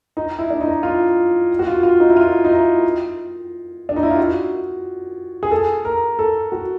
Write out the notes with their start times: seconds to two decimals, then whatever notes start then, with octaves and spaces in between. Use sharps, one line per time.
0.17 D#4
0.39 E4
0.50 D4
0.61 D#4
0.83 F4
1.59 F#4
1.67 F4
1.83 F4
2.00 D#4
2.10 E4
2.16 F4
2.45 D#4
2.51 E4
3.89 D4
3.96 D#4
4.03 E4
4.11 F4
4.18 F#4
5.43 G#4
5.51 A4
5.85 A#4
6.19 A4
6.52 F#4